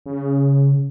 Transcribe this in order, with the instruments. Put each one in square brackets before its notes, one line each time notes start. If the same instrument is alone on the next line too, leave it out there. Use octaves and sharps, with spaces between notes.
[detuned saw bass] C#3